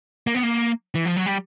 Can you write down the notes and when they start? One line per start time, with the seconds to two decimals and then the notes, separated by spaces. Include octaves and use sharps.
0.27 A#3
0.34 B3
0.43 A#3
0.95 E3
1.05 F3
1.17 F#3
1.26 G3